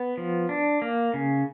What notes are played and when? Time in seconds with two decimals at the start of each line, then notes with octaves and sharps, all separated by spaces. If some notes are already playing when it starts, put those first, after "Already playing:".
Already playing: B3
0.18 F3
0.49 D4
0.82 A#3
1.14 C#3